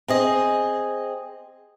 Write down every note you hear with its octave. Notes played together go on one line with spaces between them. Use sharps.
C4 G#4 D#5